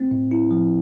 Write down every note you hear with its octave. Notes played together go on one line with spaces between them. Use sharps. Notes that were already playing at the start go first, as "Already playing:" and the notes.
Already playing: A3 C4
A2
E4
F3